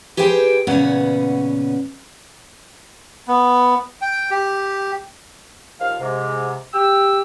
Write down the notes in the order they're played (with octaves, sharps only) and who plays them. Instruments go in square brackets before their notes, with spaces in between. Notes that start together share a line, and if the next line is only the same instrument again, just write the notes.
[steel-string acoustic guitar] G4 G#4 B4 C5 G5
E2 A#2 C#3 B3 C#4 F#5
[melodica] B3
G5
G4
[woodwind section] D#2 F3 F5
G#2 C3
G4 E6